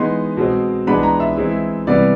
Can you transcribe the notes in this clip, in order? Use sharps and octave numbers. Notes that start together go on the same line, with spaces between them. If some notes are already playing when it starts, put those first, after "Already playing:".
Already playing: E3 G#3 B3 D#4 C6
B2 G#3 C4
E3 G#3 B3 D4 B5
A#5
E5
E3 G#3 C4 E4
C3 E3 G3 B3 D5